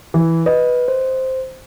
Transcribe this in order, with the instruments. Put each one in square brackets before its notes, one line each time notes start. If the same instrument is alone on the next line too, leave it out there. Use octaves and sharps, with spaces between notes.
[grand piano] E3
[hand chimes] B4 [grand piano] D#5
[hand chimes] C5